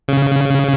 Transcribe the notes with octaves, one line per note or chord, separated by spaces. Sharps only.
C#3